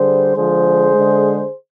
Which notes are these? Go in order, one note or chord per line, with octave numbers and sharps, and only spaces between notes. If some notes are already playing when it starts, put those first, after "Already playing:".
Already playing: D3 G3 G#4 C5
D3 F3 G#3 G#4 C5
D3 G#3